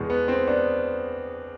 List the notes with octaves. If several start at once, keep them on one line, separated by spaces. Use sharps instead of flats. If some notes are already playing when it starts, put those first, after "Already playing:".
Already playing: E2 B2 G#3
B3
C4
B3 D4